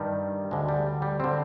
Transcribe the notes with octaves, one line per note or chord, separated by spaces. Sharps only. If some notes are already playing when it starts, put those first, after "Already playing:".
Already playing: G2 D#3 G3
D2 D3 G#3
G3
G3
D3 C4